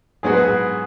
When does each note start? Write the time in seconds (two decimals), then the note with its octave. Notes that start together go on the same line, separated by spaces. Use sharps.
0.23 G#2 F#3 B3 F#4 G#4
0.33 B4
0.44 G#4